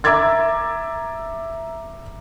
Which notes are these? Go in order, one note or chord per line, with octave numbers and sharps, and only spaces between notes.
E5 A#5 D6 E6 G#6 A6